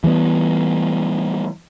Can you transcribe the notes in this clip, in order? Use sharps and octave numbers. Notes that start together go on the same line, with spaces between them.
E3 G3 A3 B3